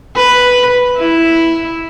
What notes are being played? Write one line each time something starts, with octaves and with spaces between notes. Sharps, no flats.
B4
E4